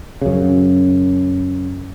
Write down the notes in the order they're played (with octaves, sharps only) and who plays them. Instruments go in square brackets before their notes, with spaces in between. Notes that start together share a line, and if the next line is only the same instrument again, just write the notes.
[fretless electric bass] F#2 C#3